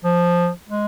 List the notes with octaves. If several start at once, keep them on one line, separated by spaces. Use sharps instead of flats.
F3
G#3